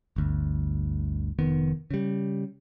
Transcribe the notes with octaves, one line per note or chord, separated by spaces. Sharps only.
G1 D2
F1 D#3 B3
C#3 G3